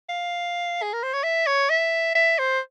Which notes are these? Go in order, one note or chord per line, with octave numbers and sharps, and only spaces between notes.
F5
G#4
A#4
C5
C#5
E5
C#5
E5
E5
C5